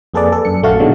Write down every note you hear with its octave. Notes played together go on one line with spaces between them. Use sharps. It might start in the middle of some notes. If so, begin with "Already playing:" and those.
F2 A#3 G#4 A4 B4 D5
A4
F#2 C#7
A#1 A3 F#4 F5 A5
B2 D3 D#3 F#3 G#3